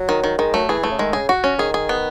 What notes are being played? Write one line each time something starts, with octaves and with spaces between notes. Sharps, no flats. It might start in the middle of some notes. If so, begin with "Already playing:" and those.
Already playing: F#3
D#3
D#3
D#3 G#3
F#3 A3
E3 G#4
A3
C#3
D#3 G#3
C#3 G#4
F#4
C#4
D#3 G#4
G#4
B3